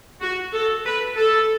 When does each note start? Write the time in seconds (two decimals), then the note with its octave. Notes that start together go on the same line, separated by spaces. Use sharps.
0.22 F#4
0.54 A4
0.85 B4
1.17 A4